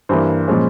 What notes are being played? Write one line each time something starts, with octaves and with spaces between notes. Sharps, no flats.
G2 E3 A#3 C5
A#2 F3 G#3 C#4